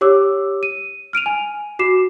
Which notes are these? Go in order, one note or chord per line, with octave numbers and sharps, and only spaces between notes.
G4 C#5 D6 E6
D#7
F6 D7 D#7 F7
G#5
F#4 D6 C7 E7